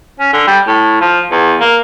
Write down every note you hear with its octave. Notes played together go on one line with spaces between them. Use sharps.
C#4
D3
G3
A2
F3
E2
A#3